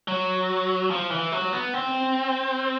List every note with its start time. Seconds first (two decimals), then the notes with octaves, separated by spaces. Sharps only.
0.08 F#3
0.91 F3
1.11 E3
1.32 F#3
1.53 B3
1.74 C4